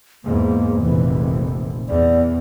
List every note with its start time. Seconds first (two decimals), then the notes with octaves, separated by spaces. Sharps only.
0.24 E2 G#2 A#3
0.81 F1 A#1 E3
1.89 E2 D5